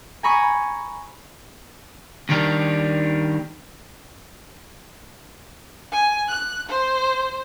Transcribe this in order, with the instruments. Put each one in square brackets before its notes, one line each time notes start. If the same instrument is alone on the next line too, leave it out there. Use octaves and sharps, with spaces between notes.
[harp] G#5 A#5 B5 C#6 D#6
[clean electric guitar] D#2 D#3 G3 D4 A#4
[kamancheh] G#5
F#6
C5